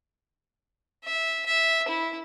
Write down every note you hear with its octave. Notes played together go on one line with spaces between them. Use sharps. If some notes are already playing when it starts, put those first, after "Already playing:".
E5
E5
E4